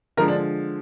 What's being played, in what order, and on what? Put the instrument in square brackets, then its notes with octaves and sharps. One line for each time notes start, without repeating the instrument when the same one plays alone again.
[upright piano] D3 F3 G#3 A#4
D4